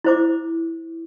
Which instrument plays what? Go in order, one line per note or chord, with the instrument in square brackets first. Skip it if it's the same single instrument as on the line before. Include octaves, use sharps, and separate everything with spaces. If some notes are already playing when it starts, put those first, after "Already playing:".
[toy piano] E4 C5 D6